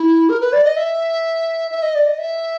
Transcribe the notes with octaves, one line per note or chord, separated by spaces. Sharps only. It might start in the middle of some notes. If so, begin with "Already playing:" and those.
Already playing: E4
A#4
B4
D5
D#5
E5
E5
D#5
D5
D#5
E5